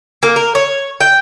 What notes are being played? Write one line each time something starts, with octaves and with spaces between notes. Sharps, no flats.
A#3
A#4
C#5
G5